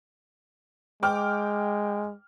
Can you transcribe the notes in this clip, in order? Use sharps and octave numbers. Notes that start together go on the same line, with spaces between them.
G#3 G5 D6 F6